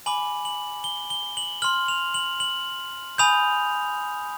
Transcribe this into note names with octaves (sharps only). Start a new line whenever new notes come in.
G#5 B5 D6 F#7
F#7
G7
G7
F#7
C6 F6 F#7
F7
F#7
F#7
G#5 B5 D#6 G6 F7